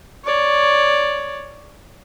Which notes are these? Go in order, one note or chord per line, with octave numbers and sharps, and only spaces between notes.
C#5 D5